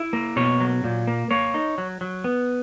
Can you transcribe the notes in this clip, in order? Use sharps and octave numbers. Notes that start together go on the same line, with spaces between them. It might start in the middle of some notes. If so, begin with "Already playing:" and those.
Already playing: E4
A#3
B2 C#5
F#3
A#2
A#3
A#3 C#5
D#4
F#3
F#3
B3